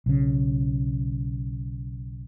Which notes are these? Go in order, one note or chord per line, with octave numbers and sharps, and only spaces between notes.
B1 C#3